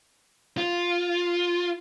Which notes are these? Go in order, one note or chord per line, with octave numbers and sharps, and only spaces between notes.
F4